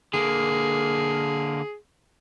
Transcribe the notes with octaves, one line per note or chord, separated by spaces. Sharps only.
D3 A#3 G#4